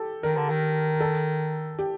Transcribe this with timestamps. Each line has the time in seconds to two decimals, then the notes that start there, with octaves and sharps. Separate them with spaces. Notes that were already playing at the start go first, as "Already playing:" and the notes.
Already playing: G4 A4
0.23 D#3 A#4
0.36 D3
0.49 D#3
1.00 A4
1.79 G4